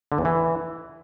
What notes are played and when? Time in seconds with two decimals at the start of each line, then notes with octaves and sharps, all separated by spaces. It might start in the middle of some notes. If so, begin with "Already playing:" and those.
0.12 D3
0.18 E2
0.25 E3